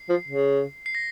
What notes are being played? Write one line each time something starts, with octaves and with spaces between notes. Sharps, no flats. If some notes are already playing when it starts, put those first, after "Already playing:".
Already playing: C7
F3
C#3
C7
A#6